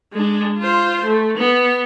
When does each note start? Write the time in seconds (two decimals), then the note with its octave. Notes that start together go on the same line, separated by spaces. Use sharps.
0.13 G#3 D4
0.58 F4 C5
1.04 A3
1.37 B3